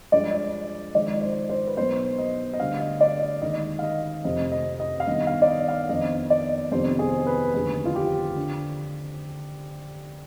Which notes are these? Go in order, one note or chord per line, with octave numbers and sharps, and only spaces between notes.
G2 F3 G#3 D4 D5
G#1 G#2 F3 D5
C5
C5
B4
B1 B2 B3 C5
D#5
D#5
D2 D3 G3 D4 F5
D#5
D5
D#5
D#2 D#3 G#3 D#5
F5
D#5
F1 F2 C3 D#5
D#5
D#5
F5
G2 D#3 B3 D#5
F5
D5
D#5
F5
F2 D#3 B3 D4 D#5
D5
F2 C3 D#3 B3 D4 C5
G#4
B4
F1 D#2 D3 G#4
F4
G4
D3